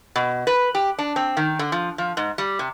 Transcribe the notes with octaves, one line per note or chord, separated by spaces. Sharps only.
B2
B4
G4
D4
C4
D#3
D3
F3
F3
G#2
G3
C3